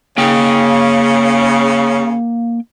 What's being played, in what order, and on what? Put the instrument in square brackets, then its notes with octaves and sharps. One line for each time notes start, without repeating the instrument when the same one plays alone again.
[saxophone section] C#3 [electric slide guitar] A#3 G5